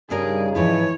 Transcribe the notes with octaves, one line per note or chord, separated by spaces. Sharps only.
G2 C#3 G3 D4 D#4 G#4 A#4
G#2 E3 F3 B4 C#5